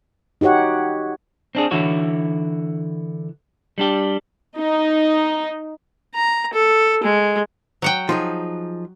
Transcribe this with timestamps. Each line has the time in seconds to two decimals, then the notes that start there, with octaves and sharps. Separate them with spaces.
0.41 D#4 F#4 G4 C#5 F#5
1.55 C4 D4 G#4
1.71 D3 E3 E4 F#4 C#5
3.78 G3 D4 G4
4.56 D#4
6.15 A#5
6.53 A4
7.04 G#3
7.82 F#3 F#5 G5
8.09 F3 D#4 G#4